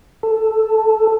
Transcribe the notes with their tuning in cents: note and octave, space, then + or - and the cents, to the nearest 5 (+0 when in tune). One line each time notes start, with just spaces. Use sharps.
A4 +0